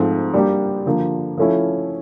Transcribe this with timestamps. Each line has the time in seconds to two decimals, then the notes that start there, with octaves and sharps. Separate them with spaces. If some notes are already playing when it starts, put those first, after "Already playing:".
Already playing: G#2 F3 A3 C4
0.34 G3 A#3 D4 G4
0.86 D3 F3 A#3
1.38 F3 A3 C#4 E4 A4